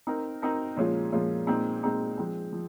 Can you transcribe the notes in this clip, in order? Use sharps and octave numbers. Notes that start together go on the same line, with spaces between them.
C4 D#4 A#4
C4 D#4 A#4
A#2 F3 G#3 C#4 F4
A#2 F3 G#3 C#4 F4
A#2 G#3 C4 D#4
A#2 G#3 C4 D#4
F3 G#3 C4
F3